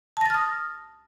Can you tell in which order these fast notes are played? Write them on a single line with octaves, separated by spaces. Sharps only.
A5 A#6 A6 F6 D#6